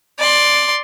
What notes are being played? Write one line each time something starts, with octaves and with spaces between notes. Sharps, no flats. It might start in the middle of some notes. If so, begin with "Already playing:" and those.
D5 C6